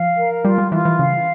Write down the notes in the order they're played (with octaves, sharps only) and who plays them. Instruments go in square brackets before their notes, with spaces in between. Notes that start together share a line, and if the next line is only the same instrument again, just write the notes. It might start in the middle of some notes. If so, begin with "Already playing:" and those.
Already playing: [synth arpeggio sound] F3 [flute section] F5
[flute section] A#4
[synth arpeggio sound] G3 [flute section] F4
[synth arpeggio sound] G3
[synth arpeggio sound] E3 [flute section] F4
[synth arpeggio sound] E3
[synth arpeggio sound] C#3 [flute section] F5